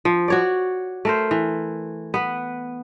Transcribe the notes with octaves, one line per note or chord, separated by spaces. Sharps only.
F3
F#4 C#5 D5
A3 A#4 C5
E3
B3 B4